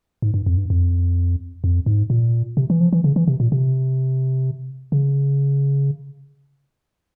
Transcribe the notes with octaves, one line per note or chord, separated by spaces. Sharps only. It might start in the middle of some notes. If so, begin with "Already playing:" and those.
G#2
G2
F2
G2
F2
F2
G#2
A#2
C3
E3
F3
E3
C#3
E3
C3
A#2
C3
C#3